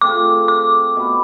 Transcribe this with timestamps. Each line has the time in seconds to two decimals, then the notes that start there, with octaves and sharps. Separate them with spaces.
0.01 A3 C4 F4 G#4 D6
0.48 D6
0.96 B2 B3 E4 B4